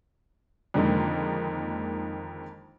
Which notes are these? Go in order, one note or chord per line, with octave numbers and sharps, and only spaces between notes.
F2 D3 D#3 G#3 A#3